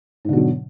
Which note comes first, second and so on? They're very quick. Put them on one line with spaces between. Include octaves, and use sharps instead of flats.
G#2 D3 B2 F#3